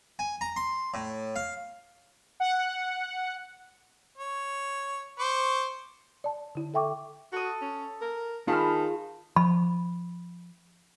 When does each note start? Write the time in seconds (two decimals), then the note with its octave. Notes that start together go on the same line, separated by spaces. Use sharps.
0.19 G#5
0.41 A#5
0.56 C6
0.94 A2
1.36 F5
2.40 F#5
4.18 C#5
5.19 C5 C#6 D6
6.24 D5 A5
6.55 D3 E4
6.74 A4 E5 G5 C#6 D6
7.32 F#4 A4 D#6
7.62 C#4
8.02 A#4
8.48 D#3 F4 G#4 A5 B5 F6
9.36 F3 B5